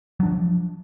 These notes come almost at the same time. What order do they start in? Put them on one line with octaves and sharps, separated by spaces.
F#3 D4 F3